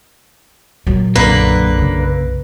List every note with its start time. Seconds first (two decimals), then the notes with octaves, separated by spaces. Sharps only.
0.87 A#2 F#3
1.16 B1 F#2 D3 A#3 B4
1.79 C#3